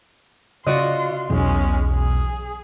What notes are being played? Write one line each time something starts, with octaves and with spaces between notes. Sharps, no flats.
C#3 F4 F#4 D5 D#5 C6
B1 E2 G#3 C#4
G#4